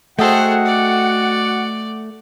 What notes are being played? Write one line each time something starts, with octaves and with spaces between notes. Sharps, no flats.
A3 F#4 G#4 A4 C5 D#5 F#5 G5
D5